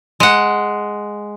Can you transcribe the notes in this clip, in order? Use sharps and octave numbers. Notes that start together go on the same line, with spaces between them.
G#3 F#5